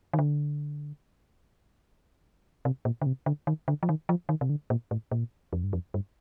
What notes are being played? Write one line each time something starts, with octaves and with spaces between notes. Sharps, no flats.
D#3
D3
C3
A#2
D3
C3
D3
D#3
D3
F3
D#3
F3
D#3
C3
D3
A#2
A2
A#2
F2
G2
F2
G2